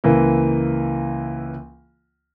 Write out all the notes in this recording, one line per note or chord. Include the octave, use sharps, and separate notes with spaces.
C#2 E3 A#3